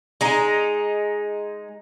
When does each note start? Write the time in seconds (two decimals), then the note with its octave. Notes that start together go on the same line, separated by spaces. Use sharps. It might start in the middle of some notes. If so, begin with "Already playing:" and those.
0.21 G#3 D#4